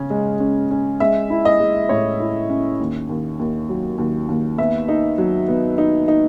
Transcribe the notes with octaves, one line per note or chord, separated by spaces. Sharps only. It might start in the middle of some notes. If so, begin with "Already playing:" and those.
Already playing: C#3 C#4
G#3
C#4
C#4
G#3 E5
E4
D#5
G#3
A2 C#5
E4
C#4
D#2
D#2
D#2
F#3
D#2
D#2
B3 E5
D#4
F#3
B3
D#4
D#4